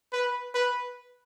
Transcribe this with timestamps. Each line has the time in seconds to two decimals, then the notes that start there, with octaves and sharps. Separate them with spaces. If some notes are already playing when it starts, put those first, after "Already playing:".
0.13 B4
0.54 B4